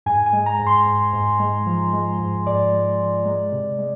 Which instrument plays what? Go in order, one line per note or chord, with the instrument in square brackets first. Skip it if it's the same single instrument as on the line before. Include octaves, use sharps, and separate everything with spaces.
[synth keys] G#2 G#5
G#5
G#3
A#5
G#2
C6
G#2
G#2
G#3
F3
G#3
G#2
G#2 D5
G#3
F3
G#3
C3
G#3